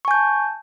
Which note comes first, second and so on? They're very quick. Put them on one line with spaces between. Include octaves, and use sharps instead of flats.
C#6 G#5 G6 A5